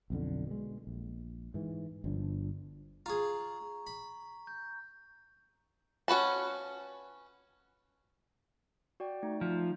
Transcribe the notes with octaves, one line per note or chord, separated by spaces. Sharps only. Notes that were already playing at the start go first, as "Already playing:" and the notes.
B1 F2 D3
B2 G#3
A#1
G#2 E3
G1 F3 D4
F4 G#4 A#5 C#6
B5
G6
C#4 F#4 B4 A5
F#4 D5 G5
A3 D#4
F3